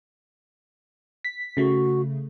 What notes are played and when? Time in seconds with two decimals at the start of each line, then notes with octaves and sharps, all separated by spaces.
1.25 B6
1.57 C#3 A3 F#4